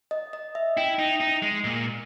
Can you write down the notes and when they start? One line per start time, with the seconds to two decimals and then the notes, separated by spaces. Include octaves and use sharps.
0.11 D#5
0.33 D#5
0.55 E5
0.77 E4 G5
0.99 D#4
1.20 D#4
1.43 G#3
1.64 A#2